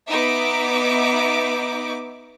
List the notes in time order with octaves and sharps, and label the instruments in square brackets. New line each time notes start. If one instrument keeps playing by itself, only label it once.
[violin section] B3 D#4 E5 D6